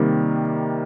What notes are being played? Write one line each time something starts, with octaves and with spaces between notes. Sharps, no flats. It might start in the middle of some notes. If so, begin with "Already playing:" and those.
Already playing: C3 D#3 G3 A#3